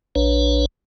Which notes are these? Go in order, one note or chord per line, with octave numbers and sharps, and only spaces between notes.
A#1 D4 B4 C#5